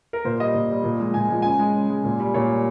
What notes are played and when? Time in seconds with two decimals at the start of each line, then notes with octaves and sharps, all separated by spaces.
0.13 A#4
0.25 A#2 C5
0.40 G3 D#5
0.54 A#2
0.70 G3
0.84 A#2
1.00 F3 G#3
1.14 A#2 G#5
1.29 F3 G#3
1.42 C#3 G#5
1.59 G#3
1.75 C#3
1.90 G#3
2.04 A#2
2.20 G3
2.34 A#2 C#5
2.49 G3